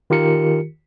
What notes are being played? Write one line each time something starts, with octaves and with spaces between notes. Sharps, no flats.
D#3 F4 G4 A#4 C#7